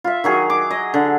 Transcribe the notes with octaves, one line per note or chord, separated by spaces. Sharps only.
F4 E5
D#3 F#3 G#4
D6
D#5
D3